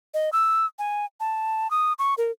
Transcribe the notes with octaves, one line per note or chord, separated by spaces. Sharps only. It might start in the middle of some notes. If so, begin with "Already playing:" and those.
D#5
E6
G#5
A5
D#6
C#6
A#4